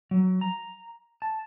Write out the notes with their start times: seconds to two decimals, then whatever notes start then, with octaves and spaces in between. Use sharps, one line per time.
0.11 F#3
0.41 A#5
1.22 A5